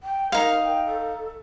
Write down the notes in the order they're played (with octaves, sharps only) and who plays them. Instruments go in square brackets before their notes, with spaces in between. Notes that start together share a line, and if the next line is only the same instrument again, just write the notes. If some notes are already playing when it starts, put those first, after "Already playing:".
[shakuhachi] G5
[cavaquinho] D#4 F5 [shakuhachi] A#4
[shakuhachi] G5
A4